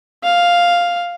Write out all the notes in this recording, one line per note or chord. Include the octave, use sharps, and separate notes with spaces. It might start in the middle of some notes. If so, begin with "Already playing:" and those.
F5